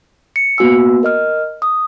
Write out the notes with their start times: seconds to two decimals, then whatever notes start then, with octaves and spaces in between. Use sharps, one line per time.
0.36 C#7
0.58 A#3 B3 F#4 G#5 E6
1.03 A#4 D#5 F6
1.62 D#6